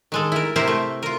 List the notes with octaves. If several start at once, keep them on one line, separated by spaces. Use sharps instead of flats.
D#3 G#3 A4
E4 A#4
C3 E4 G4 A#4 C5
A3
F4 A#4